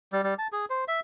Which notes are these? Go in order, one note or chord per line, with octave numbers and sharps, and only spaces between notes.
G3
G3
A5
G#4
C5
E5